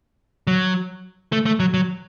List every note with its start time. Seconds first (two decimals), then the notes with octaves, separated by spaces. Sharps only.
0.47 F#3
1.32 A3
1.46 A3
1.60 F#3
1.74 F#3